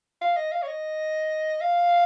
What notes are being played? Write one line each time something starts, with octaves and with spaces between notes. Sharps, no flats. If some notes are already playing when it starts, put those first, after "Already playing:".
F5
D#5
F5
C#5
D#5
F5